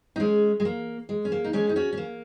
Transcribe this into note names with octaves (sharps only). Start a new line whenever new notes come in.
D#4
G#3 C#4
G#3
A#3
G#3
C#4
A#3
D#4
G#3 C#4
D#4
C#4 F#4
C#4
A#3